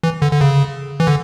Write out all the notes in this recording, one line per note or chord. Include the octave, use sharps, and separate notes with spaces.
E3
D3
D3
C#3
E3
D3